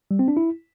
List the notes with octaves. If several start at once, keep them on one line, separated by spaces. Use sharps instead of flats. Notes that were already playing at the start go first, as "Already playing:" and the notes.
G3
C4
D4
E4